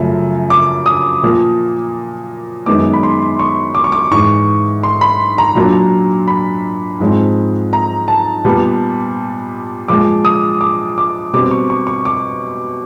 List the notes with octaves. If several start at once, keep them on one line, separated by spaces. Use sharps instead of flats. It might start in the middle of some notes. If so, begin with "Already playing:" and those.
Already playing: F#2 C#3 F3 A3
D6
D#6
A#2 F3 A#3
F#2 D#3 G#3 B3 D#4 D6
B5
C6
C#6
D6
C#6
D6
G#2 E3 G#3 C#6
C6
B5
A#5
A#2 F#3 A#3 D4 A#5
B5
G#2 F3 G#3 C4
A#5
A5
A#2 G3 B3
A#2 F3 G#3 D6
D#6
D6
D6
B2 G3 C4 D6
C#6
C#6
C#6
D6